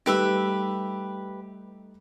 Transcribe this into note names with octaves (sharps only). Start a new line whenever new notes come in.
G3 A3 D#4 G4 B4 E5